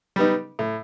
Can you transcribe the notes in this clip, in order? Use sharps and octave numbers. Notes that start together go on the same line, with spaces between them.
G3 B3 D#4
A2